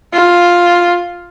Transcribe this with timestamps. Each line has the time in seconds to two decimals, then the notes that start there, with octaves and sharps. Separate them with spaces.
0.14 F4